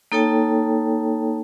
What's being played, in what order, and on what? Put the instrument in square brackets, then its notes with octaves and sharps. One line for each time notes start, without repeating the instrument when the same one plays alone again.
[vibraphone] A#3 D#4 A4 C#5 G5 A5